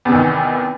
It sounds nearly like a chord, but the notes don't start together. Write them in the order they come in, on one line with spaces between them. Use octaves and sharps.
E2 C3 E3 D#3